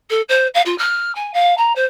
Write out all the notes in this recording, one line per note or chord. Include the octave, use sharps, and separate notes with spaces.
A4
C5
F5
F4
F6
G#5
F5
A#5
C5